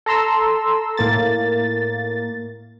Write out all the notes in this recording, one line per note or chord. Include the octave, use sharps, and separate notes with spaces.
A4 A#5 C6 E6
A2 A#3 A6